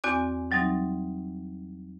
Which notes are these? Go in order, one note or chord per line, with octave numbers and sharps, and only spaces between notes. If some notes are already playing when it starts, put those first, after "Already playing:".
E2 C4 F#4 D5 G#5 D6
E3 F#3 G3 C4 D#4